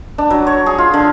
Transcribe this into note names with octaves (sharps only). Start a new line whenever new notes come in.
D4
F#3
C#5
G#4
F4
D3